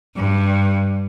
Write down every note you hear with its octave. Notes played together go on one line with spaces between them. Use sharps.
G2